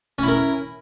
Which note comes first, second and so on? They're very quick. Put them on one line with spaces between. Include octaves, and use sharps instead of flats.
C#4 E4 A#4